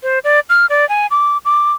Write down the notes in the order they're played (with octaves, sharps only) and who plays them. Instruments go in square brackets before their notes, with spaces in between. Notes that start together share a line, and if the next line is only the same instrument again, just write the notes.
[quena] C5
D5
F6
D5
G#5
D6
D6